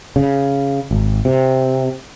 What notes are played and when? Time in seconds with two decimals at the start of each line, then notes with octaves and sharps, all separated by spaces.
0.16 C#3
0.91 G#1
1.25 C3